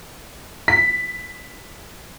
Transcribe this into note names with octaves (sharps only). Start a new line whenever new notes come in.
B6